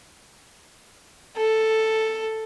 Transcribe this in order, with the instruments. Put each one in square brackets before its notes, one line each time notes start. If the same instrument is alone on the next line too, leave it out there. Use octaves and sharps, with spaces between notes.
[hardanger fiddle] A4